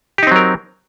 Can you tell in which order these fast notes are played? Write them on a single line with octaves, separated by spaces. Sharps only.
G4 D#4 C4 F#3 A#4